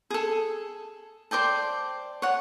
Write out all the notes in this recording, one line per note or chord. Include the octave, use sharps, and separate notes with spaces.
G#4 A4
C5 D5 G5 A5
C#5 F#5